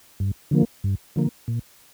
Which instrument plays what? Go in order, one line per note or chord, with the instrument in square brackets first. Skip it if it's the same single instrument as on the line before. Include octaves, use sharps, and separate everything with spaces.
[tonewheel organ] G2
D3 F3 A#3
G2
D3 F3 A#3
A#2